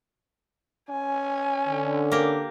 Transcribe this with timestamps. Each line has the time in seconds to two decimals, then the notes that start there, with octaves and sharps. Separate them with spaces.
0.89 C#4 G#5
1.68 D3
2.12 A#3 G4